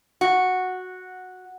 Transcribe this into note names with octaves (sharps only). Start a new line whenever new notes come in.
F#4